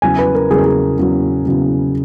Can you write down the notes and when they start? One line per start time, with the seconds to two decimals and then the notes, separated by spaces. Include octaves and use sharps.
0.02 E2 C#3 F#3 G#5
0.18 B4
0.35 A#4
0.50 E2 C#3 F#3 G#4
0.58 A#4
0.66 G#4
0.98 E2 C#3 F#3
1.46 E2 C#3 F#3